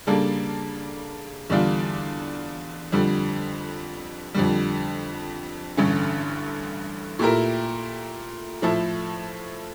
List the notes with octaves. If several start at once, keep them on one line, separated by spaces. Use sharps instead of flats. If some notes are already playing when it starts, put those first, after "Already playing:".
C#3 G3 A#3 D4 A4
E2 D3 G3 D4 F4
F2 D3 G3
F2 D3 G3
A1 G2 D3 A3 C#4
A#2 A3 E4 G4 A#4
A2 F3 A3 E4 A4